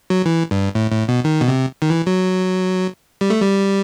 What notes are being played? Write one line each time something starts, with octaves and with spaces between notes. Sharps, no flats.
F#3
E3
G2
A2
A2
B2
D#3
B2
C3
D#3
E3
F#3
G3
A3
G3